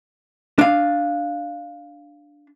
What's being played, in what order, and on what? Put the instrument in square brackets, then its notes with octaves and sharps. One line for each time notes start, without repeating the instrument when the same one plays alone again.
[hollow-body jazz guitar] D4 F5